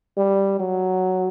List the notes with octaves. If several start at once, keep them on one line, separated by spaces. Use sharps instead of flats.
G3
F#3